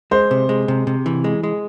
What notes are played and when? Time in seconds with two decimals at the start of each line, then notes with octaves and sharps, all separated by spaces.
0.11 G#3 C5
0.31 C3
0.49 G#3
0.68 C3
0.87 C3
1.06 E3
1.24 G#3
1.43 G#3